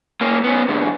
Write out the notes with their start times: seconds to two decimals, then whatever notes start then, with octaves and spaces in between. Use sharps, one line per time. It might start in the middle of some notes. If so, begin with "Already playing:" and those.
0.21 A#3 C#4
0.44 B3 C#4
0.69 G#2 D3